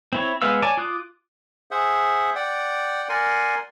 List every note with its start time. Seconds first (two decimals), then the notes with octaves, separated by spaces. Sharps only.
0.13 C4 E4 C#5
0.42 G#3 B3 B4 F5 E6
0.62 C#5 D5 G#5 A5 D6
0.77 F4 D6 D#6 F#6
1.71 G#4 C5 E5 F#5
2.35 D5 F#5 G5
3.09 A#4 D5 F#5 G#5 C6